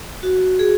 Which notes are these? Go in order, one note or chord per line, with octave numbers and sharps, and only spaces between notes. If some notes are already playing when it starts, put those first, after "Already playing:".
F#4
G#4